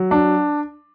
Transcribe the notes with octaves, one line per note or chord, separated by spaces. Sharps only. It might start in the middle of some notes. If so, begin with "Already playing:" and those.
Already playing: F#3
D4